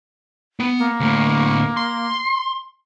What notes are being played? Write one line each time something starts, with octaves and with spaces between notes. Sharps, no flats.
B3
A#3
D2 A2
C6